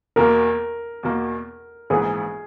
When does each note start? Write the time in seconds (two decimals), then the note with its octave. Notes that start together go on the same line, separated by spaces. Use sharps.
0.16 E2 B2 A#3 A#4
1.03 E2 B2 A#3
1.90 A#1 G#2 E3 B3 G#4